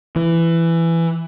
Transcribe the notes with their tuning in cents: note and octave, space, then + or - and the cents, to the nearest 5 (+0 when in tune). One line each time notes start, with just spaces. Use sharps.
E3 +15